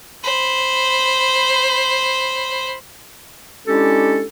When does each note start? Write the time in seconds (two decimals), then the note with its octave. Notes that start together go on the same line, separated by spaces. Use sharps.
0.23 C5 B5
3.67 G#3 C#4 D4 E4 G4 A4